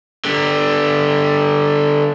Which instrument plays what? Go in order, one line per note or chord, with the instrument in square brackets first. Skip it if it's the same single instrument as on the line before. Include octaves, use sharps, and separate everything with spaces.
[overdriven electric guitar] D3 G3